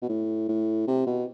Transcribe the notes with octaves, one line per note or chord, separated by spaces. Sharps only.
B2
A2
A2
C3
B2